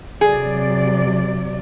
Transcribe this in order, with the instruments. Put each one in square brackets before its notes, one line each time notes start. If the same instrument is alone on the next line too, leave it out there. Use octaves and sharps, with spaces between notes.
[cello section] C3 F#3 D5 [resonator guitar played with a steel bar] G#4